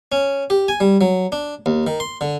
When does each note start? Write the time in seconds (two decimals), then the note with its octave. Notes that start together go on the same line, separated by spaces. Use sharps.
0.12 C#4
0.50 G4
0.68 G#5
0.80 G3
1.01 F#3
1.32 D4
1.66 D#2
1.87 D#3
2.00 C6
2.21 D3